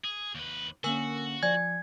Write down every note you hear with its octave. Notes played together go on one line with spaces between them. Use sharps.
G#4
D#2 B4
D3 A#3 C#4 F#4 A#4 G#5 E6
F3 D5 G#5 G#6